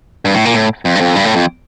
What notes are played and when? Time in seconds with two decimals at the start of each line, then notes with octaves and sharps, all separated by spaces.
0.25 G2
0.34 A2
0.45 A#2
0.54 A2
0.85 F2
0.95 G2
1.01 F2
1.15 G2
1.25 A2
1.36 F2